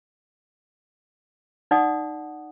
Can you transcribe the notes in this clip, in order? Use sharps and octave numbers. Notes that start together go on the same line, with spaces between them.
D#4 D5 F#5 D#6